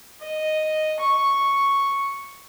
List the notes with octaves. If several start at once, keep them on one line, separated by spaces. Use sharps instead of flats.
D#5
C#6